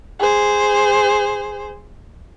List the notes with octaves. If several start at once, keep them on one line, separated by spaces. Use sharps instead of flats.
G#4 C5